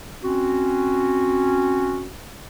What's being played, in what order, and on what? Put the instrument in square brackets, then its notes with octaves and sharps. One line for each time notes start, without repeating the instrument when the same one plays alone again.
[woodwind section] C4 C#4 F#4